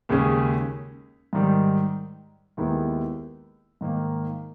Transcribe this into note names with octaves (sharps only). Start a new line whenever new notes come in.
D#2 C#3 G#3 C#4 G#4
G#2 D#3 G3
D#2 D#3 G#3 B3 E4
G#2 D#3 A#3